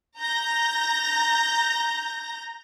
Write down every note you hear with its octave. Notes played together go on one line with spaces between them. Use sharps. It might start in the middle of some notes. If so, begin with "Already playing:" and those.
A#5 G6 A#6